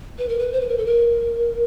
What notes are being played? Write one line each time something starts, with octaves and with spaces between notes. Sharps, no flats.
B4
A#4
B4
C5
B4
A#4
A4
A#4